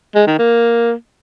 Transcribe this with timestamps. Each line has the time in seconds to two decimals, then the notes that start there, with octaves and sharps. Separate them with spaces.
0.15 G#3
0.27 D#3
0.39 A#3